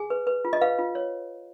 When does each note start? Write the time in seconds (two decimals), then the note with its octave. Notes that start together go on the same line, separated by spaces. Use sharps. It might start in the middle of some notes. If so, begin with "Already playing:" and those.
Already playing: G#4 G#5
0.10 B4
0.27 B4
0.45 F4
0.53 D#5
0.61 B4 F5
0.79 F4
0.95 C#5